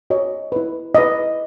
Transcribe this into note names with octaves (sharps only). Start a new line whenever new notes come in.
F#4 C#5 D#5
E4 B4
E4 B4 D#5